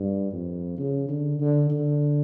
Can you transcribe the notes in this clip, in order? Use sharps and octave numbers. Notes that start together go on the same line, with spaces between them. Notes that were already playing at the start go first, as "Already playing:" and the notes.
Already playing: G2
F2
C#3
D3
D3
D3